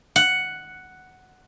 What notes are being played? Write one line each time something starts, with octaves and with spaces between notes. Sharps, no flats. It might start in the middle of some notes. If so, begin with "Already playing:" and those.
F#5